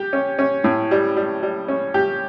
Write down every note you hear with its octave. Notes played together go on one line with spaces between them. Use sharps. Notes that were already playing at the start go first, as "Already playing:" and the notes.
Already playing: G4
C#4
C#4
A2
G3
G3
G3
C#4
G4